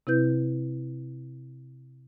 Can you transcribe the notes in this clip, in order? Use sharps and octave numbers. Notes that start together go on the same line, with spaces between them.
C3 C4 E4 B4 G6